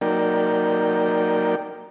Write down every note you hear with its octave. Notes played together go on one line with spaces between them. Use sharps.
F#3 A#3 D#4 A#4 D5 G5